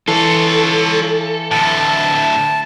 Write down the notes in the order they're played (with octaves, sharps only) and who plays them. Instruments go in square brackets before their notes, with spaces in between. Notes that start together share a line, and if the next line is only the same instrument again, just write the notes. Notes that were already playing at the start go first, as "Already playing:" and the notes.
[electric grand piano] E3 [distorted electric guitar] F4 C#5 [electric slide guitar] A4
[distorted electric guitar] D2 A2 [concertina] A5